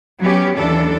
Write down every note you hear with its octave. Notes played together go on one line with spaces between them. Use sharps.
F#3 B3 C#4 G4
D#2 E3 D4 A4